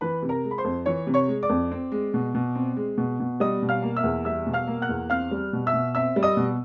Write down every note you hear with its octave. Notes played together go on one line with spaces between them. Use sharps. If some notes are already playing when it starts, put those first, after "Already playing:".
E3 B4 B5
C3
A#4 A#5
G#3
B5
C5 C6
F2
E3 C#5 C#6
C3
C#5 C#6
G#3
D5 D6
F2
C4
G#3
B2
B2
C4
G#3
B2
B2
G3 D#5 D#6
B2
F5 F6
A#3
E5 E6
E2
G3 E5 E6
B2
F5 F6
A#3
F#5 F#6
E2
C4 F5 F6
G3
B2
E5 E6
B2
C4 E5 E6
G3
D#5 D#6
B2